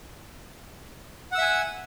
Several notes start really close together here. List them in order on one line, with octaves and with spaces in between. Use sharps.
F#5 E6 E5 G#5